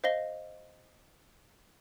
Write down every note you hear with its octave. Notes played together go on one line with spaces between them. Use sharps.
C5 D#5 F5 A#6 G7